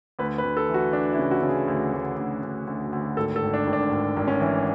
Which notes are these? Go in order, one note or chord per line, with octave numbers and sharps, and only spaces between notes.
D2 B4
B4
D2
A4
E3
F#4
E3 D4
E4
C#3
F#4
C#3
G#4
D2
D2
D2
D2
D2
D2
G#1 A4
A4
G#1
D4
G#1
D4
G#1
G#1
C#4
E3